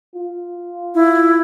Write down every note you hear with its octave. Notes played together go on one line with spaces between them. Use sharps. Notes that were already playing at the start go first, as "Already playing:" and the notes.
F4
E4